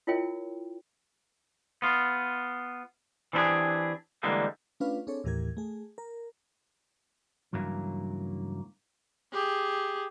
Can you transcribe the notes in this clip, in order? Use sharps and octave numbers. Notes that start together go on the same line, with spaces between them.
E4 F4 A#4 C#5 G5
B3 F4
E3 C4 D4 E4 G4 G#4
D3 E3 G3 G#3 A#3
A3 C#4 D4 F4 B4 F5
C4 D4 G#4 A4 C#5
D#2 A2 E3 G4 A#4 G#6
A3 G#4
A#4
C#2 G2 E3 F#3 A#3
G4 G#4